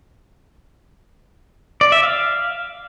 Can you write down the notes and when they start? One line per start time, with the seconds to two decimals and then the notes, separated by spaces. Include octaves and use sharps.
1.81 D5
1.92 E5
2.03 F5